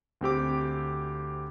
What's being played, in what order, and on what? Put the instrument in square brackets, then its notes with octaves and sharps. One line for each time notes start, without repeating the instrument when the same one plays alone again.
[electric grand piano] D2 C4 G4 D6